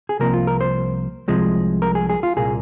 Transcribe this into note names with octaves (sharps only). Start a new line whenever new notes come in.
G#4
C2 C3 F3 A#3 A#4
F4
A#4
C5
C2 C3 F3 G#3
A#4
G#4
G#4
F4
C2 A#2 A#3 G#4